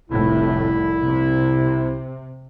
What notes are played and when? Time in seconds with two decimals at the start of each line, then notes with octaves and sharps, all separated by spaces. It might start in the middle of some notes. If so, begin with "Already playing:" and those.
0.10 F1 C2 A2 E4
1.03 C3